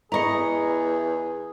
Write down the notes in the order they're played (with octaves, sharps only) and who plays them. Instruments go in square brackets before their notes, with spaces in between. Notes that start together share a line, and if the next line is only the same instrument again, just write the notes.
[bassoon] E2 [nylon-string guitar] E4 D#5 [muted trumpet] G#4 [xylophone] A#5 C#6 C#7